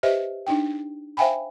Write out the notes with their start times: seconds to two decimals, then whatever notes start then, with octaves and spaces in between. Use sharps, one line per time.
0.03 G4 B4 C5 D#5 E5
0.47 D4 D#4 G5
1.17 C5 E5 F5 G5 G#5 B5